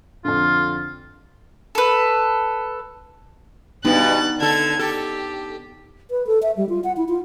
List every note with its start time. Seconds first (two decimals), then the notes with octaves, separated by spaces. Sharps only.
0.25 F2 D3 F4
1.75 A4 B4
3.85 G2 B2 B3 D4 D#4 F#6 A6
4.40 D3 A4 A5 G#6
4.79 G4 A4
6.11 B4
6.27 A4
6.42 E5
6.57 G3
6.69 F4
6.84 F#5
6.97 E4
7.09 F4